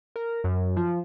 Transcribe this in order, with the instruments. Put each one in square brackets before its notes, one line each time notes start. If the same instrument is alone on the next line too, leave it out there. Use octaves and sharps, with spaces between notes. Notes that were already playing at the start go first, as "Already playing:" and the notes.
[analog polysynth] A#4
F#2
F3